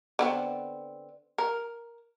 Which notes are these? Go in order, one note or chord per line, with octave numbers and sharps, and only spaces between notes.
D3 B3 C4
A#4